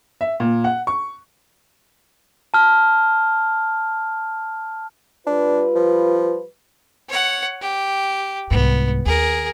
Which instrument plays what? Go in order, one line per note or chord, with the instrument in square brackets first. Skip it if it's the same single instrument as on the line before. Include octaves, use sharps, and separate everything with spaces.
[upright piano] E5
A#2
F#5
C#6
[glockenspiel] A5 F6
[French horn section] G3 F4 B4 [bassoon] D4
[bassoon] F3
[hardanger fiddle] C#5 F#5
G4
[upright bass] C2 G#2 [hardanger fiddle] B3
[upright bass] D#2 [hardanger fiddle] G#4 A#4